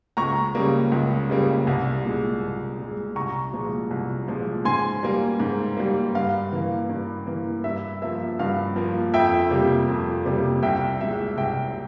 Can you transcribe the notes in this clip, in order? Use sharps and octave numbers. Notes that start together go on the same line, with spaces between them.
C#2 A#5 C#6
C#3 G3 A#3
C#2
C#3 G3 A#3
C2
A#2 G#3
C2
A#2 G#3
C2 A#5 C#6
A#2 F3 G#3
C2
A#2 F3 G#3
G#2 G#5 C6
G3 A#3
G#2
G3 A#3
G2 F5
E3 A#3
G2
E3 A#3
G2 E5
F3 A#3 E5
G2 F5
F3 A#3
F2 E5 G5
C3 G3 A#3
F2
C3 G3 A#3
C2 E5 G5
A#2 G#3 E5
C2 E5 G5